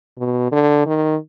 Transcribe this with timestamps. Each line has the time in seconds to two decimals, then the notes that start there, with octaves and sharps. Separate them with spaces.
0.18 B2
0.52 D3
0.86 D#3